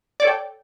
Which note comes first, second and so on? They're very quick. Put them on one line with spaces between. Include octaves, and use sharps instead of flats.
D5 C#5 A4 G5